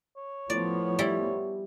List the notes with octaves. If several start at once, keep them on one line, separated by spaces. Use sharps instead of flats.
C#5
A2 F3 B3 D5
G3 E4